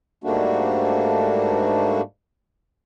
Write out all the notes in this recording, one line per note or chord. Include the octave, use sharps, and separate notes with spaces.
G#2 G3 A3 A#3 D4 F#4